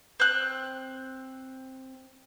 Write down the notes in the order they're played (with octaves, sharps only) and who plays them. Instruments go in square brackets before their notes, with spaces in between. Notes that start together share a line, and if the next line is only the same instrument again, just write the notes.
[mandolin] C4 F#6